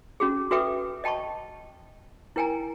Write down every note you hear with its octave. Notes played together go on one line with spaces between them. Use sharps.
C#4 F#4 G#4
F#4 A4 B4 E5 G5 D6
D#5 G5 A5 B5 C#6
E4 A#4 G5 G#5 A#5